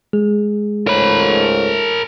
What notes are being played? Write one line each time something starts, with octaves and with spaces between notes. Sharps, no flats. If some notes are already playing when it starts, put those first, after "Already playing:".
G#3 G#4
C#2 G#2 A3 A#4 C#5 B5